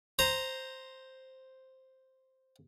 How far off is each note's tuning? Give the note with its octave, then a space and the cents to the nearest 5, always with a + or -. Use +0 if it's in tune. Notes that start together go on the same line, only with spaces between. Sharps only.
C5 +0 A#5 +0